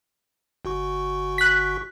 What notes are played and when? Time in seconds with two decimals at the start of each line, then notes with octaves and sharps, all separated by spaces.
0.65 G1 F#4 C#6
1.38 F#6 B6